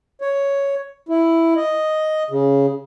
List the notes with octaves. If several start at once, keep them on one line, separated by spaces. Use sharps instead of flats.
C#5
E4
D#5
C#3